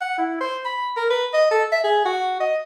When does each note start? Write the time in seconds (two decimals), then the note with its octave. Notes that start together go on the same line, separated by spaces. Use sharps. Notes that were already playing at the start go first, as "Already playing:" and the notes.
0.01 F#5
0.18 E4
0.41 C5
0.65 B5
0.96 A#4
1.10 B4
1.34 D#5
1.51 A4
1.72 E5
1.84 G#4
2.05 F#4
2.40 D#5